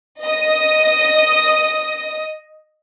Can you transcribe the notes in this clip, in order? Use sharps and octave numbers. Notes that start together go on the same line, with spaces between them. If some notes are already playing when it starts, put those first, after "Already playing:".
D#5 D#6